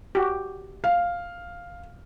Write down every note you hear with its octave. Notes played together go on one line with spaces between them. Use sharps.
F#4 G4
F5